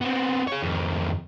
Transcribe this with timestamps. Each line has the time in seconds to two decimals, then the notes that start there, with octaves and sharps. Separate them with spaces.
0.01 B3 C4
0.47 G#4 C#5
0.63 F2 D#3